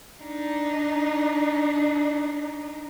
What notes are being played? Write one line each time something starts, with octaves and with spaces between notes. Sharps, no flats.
D4 D#4